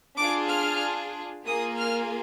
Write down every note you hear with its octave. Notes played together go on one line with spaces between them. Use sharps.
D4 F4 G#4 D6
F6
A#3 F4 G#4 D#6
F6